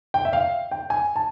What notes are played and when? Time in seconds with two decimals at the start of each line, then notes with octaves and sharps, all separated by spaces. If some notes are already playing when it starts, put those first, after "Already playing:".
0.14 G5
0.25 E5
0.33 F5
0.71 G5
0.90 G#5
1.16 A5